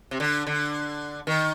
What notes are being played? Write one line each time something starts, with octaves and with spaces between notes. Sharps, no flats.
C3
D3
D3
D#3